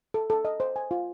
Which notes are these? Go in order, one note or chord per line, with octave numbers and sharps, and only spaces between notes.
A4
A4
D#5
C5
G#5
F4